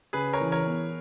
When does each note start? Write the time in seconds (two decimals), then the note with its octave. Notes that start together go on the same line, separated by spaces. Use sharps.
0.13 C#3 G#4 B4
0.33 A#4 C#5
0.40 E3
0.52 A#4 C#5
0.65 B3